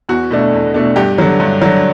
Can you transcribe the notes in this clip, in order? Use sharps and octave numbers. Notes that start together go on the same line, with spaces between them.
E2 F#4
B2 A3 D4
E2
B2 A3 D4
G2 G4
D3 F#3
G2
D3 F#3